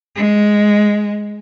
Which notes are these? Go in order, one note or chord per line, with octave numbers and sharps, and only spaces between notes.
G#3